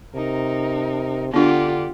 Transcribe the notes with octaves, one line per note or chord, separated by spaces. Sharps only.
C3 D#4 A#4
D3 B3 D4 F4 G4 F#5